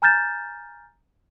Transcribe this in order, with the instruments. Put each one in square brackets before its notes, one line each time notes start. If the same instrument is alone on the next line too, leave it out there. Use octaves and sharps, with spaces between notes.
[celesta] G#5 A#5 F6 G6 A6 E7